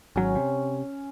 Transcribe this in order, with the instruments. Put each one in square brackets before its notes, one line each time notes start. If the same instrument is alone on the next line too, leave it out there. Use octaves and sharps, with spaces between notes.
[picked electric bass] G#1 F#3 [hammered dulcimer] C#4
[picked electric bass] C3